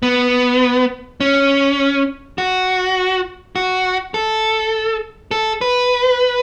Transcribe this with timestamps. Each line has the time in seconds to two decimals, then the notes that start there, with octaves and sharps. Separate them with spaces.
0.03 B3
1.20 C#4
2.38 F#4
3.56 F#4
4.14 A4
5.31 A4
5.61 B4